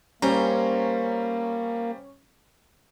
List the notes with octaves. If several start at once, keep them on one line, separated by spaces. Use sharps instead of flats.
G3 A#3 C#4 C5 A#5